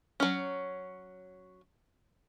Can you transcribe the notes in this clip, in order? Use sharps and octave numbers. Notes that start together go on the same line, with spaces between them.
F#3 C#4